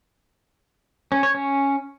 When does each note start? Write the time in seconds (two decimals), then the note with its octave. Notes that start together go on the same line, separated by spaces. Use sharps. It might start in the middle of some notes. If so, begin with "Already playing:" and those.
1.12 C#4
1.23 C#5
1.35 C#4